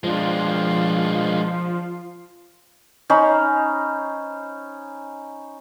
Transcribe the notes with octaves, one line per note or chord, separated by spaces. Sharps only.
F3 G#3 D4 F4
C#4 D#4 C5 B5